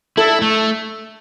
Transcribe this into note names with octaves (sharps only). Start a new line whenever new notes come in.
E4 A4
A3